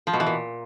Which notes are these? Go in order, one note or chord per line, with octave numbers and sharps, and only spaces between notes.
F3
B2
E3
A#2